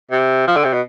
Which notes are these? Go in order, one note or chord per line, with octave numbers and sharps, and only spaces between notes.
C3
F3
D3
C3
B2